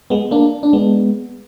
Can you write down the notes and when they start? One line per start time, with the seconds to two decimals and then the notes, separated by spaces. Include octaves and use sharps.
0.10 G#3 B3
0.31 A#3 D4
0.63 D4
0.73 G#3 B3